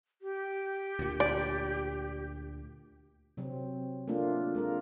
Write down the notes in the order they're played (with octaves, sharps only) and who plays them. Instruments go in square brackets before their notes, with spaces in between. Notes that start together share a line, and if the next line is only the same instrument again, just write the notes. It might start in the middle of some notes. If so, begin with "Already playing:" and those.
[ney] G4
[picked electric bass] D2 A#2
[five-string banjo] D5
[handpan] C3 F#3 C4
A3 A#3 D4 F4
G#3 F4 A#4